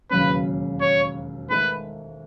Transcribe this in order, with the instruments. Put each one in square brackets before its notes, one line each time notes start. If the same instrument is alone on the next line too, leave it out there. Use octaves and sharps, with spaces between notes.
[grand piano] E1 D#2 C#3 F#3 C#4 [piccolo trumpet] B4
[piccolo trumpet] C#5
[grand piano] G#2 D#3 A3 D#4 [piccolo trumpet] B4